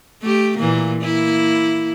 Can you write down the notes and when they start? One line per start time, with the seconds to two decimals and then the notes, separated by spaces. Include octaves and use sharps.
0.22 A3 G4
0.58 A#2 E3 A#3
1.02 A#3 E4